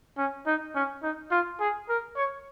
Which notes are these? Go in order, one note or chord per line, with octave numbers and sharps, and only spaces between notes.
C#4
D#4
C#4
D#4
F4
G#4
A#4
C#5